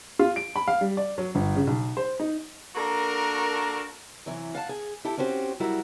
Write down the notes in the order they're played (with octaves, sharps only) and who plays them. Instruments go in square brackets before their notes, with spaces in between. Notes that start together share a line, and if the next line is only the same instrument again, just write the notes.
[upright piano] F4
D7
B5
F5
G3
D5
F#3
G1
C#3
B1
C5
D#4
[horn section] A#3 D4 F#4 A4 A#4
[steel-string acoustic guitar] C3 E3 F#3
F5 F#5 A5
G#4
E4 G4 A4
C4 C#4 F#4 G4 C5
F#3 G3 E4 F#4 A#4